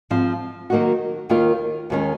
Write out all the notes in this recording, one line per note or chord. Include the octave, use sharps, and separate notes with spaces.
G#2 F3 C4
D#3 F#3 A#3 D#4 F#4
D#2 D#3 A#3 F4
D#2 D#3 G#3 C#4